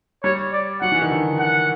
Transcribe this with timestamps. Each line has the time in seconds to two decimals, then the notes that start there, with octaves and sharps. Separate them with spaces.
0.24 G3 C#5
0.53 D5
0.82 F#3 F#5
0.92 E3
1.02 D#3
1.11 D3
1.40 F#5